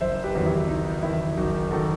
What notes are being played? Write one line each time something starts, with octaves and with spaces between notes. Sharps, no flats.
F#1 C5 E5
G4 B4
E2 D#3 F#3
E4 G4
F#1 D#4
E2 D#3 F#3 E4
F#1 D#4 F#4
D#3 F#3 F#4 A4